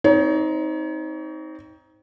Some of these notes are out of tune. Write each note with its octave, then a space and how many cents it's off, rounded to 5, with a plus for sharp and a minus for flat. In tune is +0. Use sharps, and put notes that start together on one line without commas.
C4 +0 D#4 +20 C#5 +35